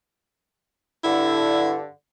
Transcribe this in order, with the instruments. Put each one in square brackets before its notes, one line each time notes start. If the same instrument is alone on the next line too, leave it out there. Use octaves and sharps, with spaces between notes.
[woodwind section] G2 D3 [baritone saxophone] E4